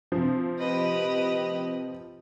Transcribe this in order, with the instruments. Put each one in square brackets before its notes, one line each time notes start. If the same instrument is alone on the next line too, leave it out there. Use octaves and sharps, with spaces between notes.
[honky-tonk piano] C3 F3
[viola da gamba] G4 B4 D#5